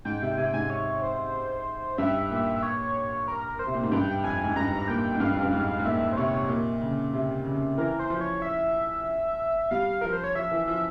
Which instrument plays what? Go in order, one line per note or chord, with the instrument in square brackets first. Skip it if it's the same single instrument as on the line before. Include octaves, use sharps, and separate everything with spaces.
[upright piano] G#2 [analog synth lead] G5
[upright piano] C3
[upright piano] C3 [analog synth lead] G#5
[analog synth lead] G5
[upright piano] G#2 [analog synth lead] G#5
[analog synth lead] C#5
C5
[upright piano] G2 [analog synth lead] E5
[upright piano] A#2
[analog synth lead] E5
C#5
A#4
A#4
C5
[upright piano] C3
A#2
G#2
[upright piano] G2 [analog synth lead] G5
[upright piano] F2 [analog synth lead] G#5
[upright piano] G#2
[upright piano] G2 [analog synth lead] A#5
[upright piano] A#2 [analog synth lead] G5
[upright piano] G#2
[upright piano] G2 [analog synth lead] F5
[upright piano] F2
G2
G#2
G#2
[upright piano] A#2 [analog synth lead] E5
[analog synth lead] C5
[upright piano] C3 [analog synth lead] C#5
[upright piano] A#2
C#3
C3
C#3
[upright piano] E3 [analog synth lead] A#4
[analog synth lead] C5
[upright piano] F3
[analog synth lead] C#5
E5
[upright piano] G3 [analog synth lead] F5
[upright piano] F3 [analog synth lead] A#4
[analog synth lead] C5
C#5
[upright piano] F3 [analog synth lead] E5
[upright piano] E3
[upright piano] F3 [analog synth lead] E5